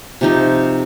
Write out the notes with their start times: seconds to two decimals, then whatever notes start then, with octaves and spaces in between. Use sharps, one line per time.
0.21 C3 F3 D#4